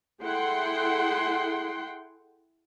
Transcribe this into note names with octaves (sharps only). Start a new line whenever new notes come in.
E4 G#4 A4 F#5 G5 C6